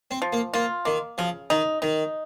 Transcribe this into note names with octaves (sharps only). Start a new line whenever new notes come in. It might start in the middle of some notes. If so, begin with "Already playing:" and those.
C4
F3
A#3
A#3 F4
D#3 A#3
C#3 F3
D#3 D#4
D#3 D#4